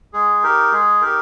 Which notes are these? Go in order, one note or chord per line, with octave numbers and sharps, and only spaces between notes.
G#3 G#4
D#4 G4 A#4
G#3 G#4
D#4 G4 A#4